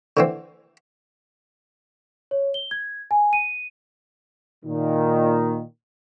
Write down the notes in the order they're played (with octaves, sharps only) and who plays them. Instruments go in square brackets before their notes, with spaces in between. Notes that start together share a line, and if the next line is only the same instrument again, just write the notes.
[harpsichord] D3 E3 C4
[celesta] C#5
G7
G#6
G#5
D#7
[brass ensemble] A#2 D#3